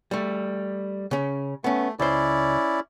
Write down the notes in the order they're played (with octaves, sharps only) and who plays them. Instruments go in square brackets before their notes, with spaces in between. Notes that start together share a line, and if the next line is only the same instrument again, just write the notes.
[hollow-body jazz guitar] G3 A3
C#3 C#4
[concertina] A3 [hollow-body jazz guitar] B3 C#4
[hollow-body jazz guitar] C#2 C5 [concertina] C#4 E4 D5